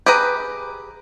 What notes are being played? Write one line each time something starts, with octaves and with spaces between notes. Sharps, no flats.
G4 G#4 B4 A#5